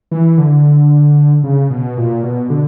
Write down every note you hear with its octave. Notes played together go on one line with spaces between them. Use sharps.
E3
D3
C#3
B2
A#2
B2
D3